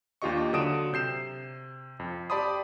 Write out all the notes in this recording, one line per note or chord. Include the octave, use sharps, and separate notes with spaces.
D#2 D4 F4 G4 D#5 C#6
D3 F#3 D#6 D7 E7
C3 G6 C7 E7
F2
G4 D5 A5 B5 C6 D#6